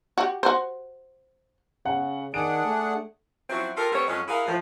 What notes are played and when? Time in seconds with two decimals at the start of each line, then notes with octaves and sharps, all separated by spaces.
0.18 F#4 G4
0.43 F#4 C5
1.85 C#3 F#5
2.34 D#3 D4 G#4 F#5 D7
2.65 A3
3.50 F3 F#3 C4 C#4 E4 F#4
3.76 F4 G4 A4 A#4
3.92 G3 A3 B3 C4 C#5
4.08 F2 F#3 G#3 C#4
4.28 E4 F#4 G#4 A#4 F5
4.46 A2 F3